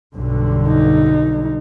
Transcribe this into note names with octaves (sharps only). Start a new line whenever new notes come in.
B1 G2 D3
D#4